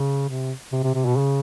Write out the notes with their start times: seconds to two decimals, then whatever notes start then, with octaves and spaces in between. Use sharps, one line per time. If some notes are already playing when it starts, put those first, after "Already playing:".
Already playing: C#3
0.29 C3
0.73 C3
0.83 C3
0.94 C3
1.06 B2
1.17 C#3